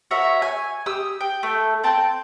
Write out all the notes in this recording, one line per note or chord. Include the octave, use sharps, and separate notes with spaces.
F#4 A#4 C#5 E5
G#5
G4 D#6 E6
G5
A3 A4
C4 G5 A5